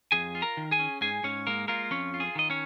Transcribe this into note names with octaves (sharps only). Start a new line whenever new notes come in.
F2 G#4 G#5
F4
A#4 A#5
D#3
G#4 G#5
C#4
G#2 G#4 G#5
G#2 C#4 C#5
G#3 A#3 A#4
A#3 F4 A#4
F2 C#4 C#5
F4
G#4
D#3 D#5
C#4 C#5